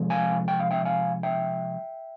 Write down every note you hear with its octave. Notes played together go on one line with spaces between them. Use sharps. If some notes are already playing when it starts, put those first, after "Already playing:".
Already playing: C3 F3 G#3
F5 G#5
G5
F5
E5 G5
F5 G#5
E5 G5